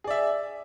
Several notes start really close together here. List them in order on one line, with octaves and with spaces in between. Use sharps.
G#4 D5 E5